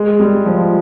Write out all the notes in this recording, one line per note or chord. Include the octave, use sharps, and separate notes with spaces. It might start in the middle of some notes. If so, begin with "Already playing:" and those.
Already playing: G#3
G3
F3